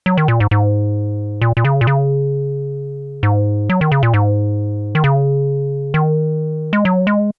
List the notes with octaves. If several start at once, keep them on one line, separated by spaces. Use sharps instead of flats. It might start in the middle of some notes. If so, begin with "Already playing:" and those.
F#3
D#3
A#2
G#2
G#2
A#2
A#2
C#3
A#2
C#3
G#2
F#3
D#3
C#3
A#2
G#2
D#3
C#3
D#3
G#3
F#3
G#3